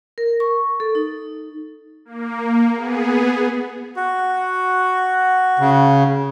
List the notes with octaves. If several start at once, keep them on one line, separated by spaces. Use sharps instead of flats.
A#4
C#6
A4
D#4
A#3
B3 G#4
F#4
C#3